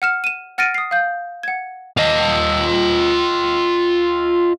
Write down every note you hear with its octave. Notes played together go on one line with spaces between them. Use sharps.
F#5 F6 E7
D#7 E7
F#5 F6 A6 A#6 D7 D#7
D#6 C7
F5 G6
F#5 G#6
F4 D#5